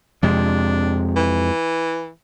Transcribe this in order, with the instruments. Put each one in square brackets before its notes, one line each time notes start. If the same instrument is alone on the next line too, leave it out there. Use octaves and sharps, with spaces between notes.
[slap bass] F2 C3 G#3 [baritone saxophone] D4
[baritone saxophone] E3